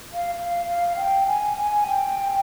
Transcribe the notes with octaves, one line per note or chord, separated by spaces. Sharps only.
F5
F5
F5
G5
G#5
G#5
G5